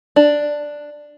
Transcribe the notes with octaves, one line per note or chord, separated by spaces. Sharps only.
D4